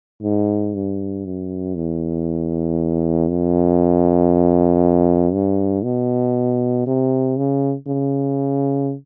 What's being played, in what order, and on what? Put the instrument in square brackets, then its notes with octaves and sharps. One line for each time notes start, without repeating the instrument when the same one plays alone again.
[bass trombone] G#2
G2
F#2
E2
F2
G2
B2
C3
C#3
C#3